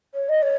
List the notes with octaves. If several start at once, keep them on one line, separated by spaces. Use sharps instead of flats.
C#5
D#5
C#5